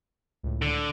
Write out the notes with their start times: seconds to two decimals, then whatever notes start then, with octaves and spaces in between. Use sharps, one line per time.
0.43 C#2 A2
0.62 D3